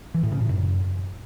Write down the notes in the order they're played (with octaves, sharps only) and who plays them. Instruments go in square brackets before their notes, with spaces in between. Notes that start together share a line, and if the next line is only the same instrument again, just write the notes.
[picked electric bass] E3
A2
C#3
A2
F#2